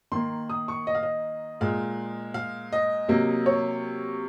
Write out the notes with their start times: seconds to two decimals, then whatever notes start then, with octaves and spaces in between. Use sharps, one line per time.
0.12 D#3 A#3 C6
0.49 D#6
0.68 C#6
0.87 D#5
0.95 F5
1.03 D#5
1.61 A#2 G#3 F5
2.34 F5
2.72 D#5
3.08 C3 F#3 A#3
3.46 C#5